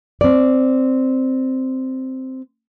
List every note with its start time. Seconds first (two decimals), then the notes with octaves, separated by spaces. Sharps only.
0.21 C4 D5